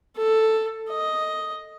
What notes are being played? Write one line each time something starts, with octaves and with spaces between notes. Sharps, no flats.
A4
D#5